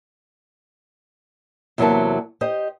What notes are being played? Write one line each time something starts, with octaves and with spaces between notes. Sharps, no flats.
E2 C3 F#3 A#3 E5 A5
G4 C5 D#5